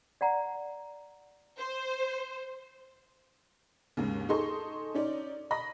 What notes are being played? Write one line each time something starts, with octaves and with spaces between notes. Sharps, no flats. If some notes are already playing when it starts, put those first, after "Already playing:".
D5 F#5 A#5
C5
D#2 G#2 C#3
D#4 G#4 A4 D#5 C6 C#6
C#4 D#4 D5
D#5 B5 A#6